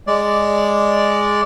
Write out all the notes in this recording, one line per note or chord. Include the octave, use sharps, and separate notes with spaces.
G#3 D5